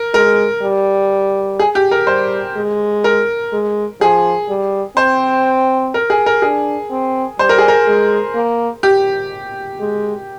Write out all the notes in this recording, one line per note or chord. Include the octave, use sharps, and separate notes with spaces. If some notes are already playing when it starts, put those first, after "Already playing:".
Already playing: A#4
G#3 A#4
G3
G#4
G4
A#4
G3 C5
G#3
A#4
G#3
F3 G#4
G3
C4 C5
A#4
G#4
A#4
D4 G#4
C4
G3 C5
A#4
G#4
A#4
G#3
A#3
G4
G#3